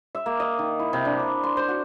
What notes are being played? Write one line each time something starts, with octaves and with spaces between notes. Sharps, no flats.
E5
A#3
D#5
D#3
E4
C3
D4
B5
C6
C5
F#4